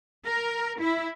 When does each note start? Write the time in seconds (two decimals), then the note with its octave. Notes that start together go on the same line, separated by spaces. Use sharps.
0.25 A#4
0.80 E4